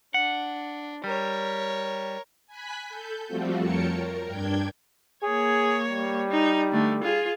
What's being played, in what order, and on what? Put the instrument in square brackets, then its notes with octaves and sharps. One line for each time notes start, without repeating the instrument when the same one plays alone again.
[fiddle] D4 [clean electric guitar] F#5
[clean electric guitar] G3 [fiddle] A#4 C#5
[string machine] G#5 B5 F#6 B6
A4 G6
F3 G3 A3 C4 F4 F#4
F2 A#4 C#5 G5 A5 C#7
A#4
G2 D4 G5 G6 G#6
[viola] A#3 C#5 [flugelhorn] G#4
[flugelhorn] G3
[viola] D#4
D3 A3
F4 G#4